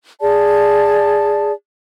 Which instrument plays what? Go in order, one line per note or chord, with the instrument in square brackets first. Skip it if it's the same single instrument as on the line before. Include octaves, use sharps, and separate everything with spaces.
[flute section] G#4 D5 A5